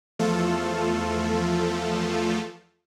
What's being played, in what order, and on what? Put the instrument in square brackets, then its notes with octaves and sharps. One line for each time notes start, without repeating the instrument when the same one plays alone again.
[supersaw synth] E2 F3 A3 F4 A4